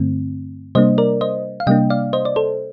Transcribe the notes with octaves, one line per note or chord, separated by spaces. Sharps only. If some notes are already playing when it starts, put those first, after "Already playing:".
Already playing: G2 D3 A3 C4
C3 G3 A#3 D4 C5 D#5
A#4 D5
C5 D#5
F5
C3 G3 A#3 D4 D#5 G5
D5 F5
C5 D#5
D5
A4 C5